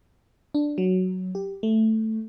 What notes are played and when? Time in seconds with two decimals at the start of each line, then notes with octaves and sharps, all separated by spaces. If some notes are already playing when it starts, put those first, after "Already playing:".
0.55 D4
0.78 F#3
1.35 G4
1.63 A3